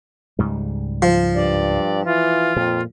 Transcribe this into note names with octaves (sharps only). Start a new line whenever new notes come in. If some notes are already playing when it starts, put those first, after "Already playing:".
C#2 G#2 G3
F3
G2 D5
E3 F4
F2 A#2